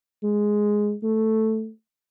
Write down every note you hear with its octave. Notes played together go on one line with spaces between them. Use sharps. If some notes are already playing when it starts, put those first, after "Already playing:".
G#3
A3